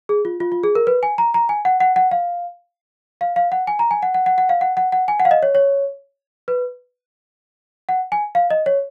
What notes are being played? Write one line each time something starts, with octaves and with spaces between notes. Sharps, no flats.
G#4
F4
F4
F4
G#4
A#4
B4
G#5
A#5
A#5
G#5
F#5
F#5
F#5
F5
F5
F5
F#5
G#5
A#5
G#5
F#5
F#5
F#5
F#5
F5
F#5
F#5
F#5
G#5
F#5
F5
D#5
C#5
C#5
B4
F#5
G#5
F5
D#5
C#5